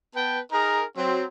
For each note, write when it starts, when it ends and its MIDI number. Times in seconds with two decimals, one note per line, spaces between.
0.15 0.40 59
0.15 0.40 71
0.15 0.40 79
0.15 0.40 81
0.52 0.82 63
0.52 0.82 68
0.52 0.82 70
0.97 1.25 54
0.97 1.25 60